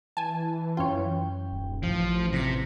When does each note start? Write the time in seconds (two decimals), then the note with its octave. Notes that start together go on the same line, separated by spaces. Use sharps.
0.17 E3 G#5 A5
0.77 F#2 C#4 F4 C#5 G5
1.52 D#1
1.83 A1 F3
2.33 C3 A#6 B6 C#7